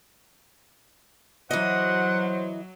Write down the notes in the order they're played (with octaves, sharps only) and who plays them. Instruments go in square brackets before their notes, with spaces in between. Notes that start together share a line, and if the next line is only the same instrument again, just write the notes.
[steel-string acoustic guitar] E3 D#5 [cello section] F#3 [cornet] C5 [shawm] F#5